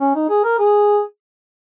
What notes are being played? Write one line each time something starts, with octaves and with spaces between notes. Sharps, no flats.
C#4
D#4
G#4
A#4
G#4